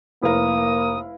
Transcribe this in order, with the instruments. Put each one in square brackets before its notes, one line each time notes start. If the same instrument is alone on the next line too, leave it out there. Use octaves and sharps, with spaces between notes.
[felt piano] F1 A#4 [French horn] A#3 [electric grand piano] E4 B4 F5 [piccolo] D#6